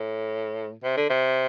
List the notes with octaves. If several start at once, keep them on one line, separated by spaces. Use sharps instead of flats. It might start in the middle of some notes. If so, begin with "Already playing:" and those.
Already playing: A2
C3
D3
C3